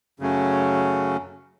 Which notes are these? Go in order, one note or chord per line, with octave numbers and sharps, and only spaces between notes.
F#2 C#3 F#3 A3 C#4